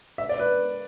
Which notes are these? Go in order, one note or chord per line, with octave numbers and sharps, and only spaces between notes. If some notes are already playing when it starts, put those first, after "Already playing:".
E5
D5
B4